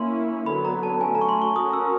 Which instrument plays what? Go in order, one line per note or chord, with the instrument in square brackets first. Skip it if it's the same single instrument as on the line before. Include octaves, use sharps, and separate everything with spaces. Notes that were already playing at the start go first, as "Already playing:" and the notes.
Already playing: [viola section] A#3 C#4 E4 [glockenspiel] C6
[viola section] D3 F#3 B3 [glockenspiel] B5
[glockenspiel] A#5
A5
[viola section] F#3 A3 C#4 [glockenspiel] G#5
[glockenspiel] A#5
C#6
C6
C#6
[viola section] C#4 F#4 A#4 [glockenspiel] D#6
[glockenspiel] E6